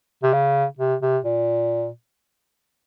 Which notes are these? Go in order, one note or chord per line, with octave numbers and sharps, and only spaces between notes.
C3
C#3
C3
C3
A#2